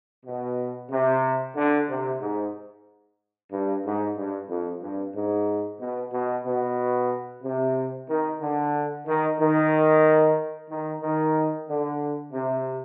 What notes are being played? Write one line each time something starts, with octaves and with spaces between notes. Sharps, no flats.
B2
C3
D3
C3
G#2
G2
G#2
G2
F2
G2
G#2
B2
B2
B2
C3
D#3
D3
D#3
D#3
D#3
D#3
D3
C3